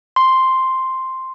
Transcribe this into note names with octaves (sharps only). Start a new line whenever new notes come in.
C6